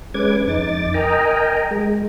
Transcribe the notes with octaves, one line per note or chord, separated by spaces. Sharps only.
G#3 C#4 B4 D6 G#6
F2 D#4 D6 A6
A#4 D#5 G5 G#5 A#5
G#3